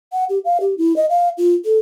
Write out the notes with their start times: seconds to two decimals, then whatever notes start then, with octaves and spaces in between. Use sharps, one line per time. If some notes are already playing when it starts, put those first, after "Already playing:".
0.12 F#5
0.29 G4
0.45 F5
0.61 G4
0.78 E4
0.96 D#5
1.10 F5
1.38 F4
1.65 A4